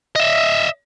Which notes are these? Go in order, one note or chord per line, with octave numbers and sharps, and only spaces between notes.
D#5 E5